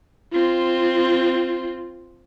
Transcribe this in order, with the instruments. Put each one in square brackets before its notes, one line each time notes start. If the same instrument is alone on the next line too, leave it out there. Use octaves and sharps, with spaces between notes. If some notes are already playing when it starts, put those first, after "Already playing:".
[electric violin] C4 F4